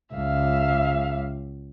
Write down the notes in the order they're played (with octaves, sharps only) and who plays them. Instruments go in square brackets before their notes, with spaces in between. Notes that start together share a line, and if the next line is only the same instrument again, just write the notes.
[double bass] C#2 [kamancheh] E5 F5